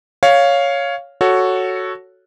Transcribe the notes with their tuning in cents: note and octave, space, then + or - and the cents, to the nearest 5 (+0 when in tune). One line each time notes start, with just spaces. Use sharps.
C#5 +5 F5 +0
F#4 +0 A4 +0 C#5 +0